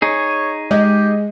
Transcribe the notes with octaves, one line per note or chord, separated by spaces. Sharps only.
D#4 G#4 C#5
G#3 G4 D#5